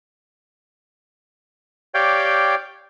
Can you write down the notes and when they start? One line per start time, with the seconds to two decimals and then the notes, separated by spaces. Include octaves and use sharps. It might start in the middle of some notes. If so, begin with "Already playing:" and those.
1.94 G4 C#5 D5 F5 G5